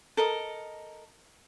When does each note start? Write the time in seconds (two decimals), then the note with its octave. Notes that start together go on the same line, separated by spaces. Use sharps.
0.17 A4 A#4 D#5 D#6